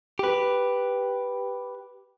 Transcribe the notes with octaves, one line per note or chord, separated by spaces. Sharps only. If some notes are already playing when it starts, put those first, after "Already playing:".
G4 B4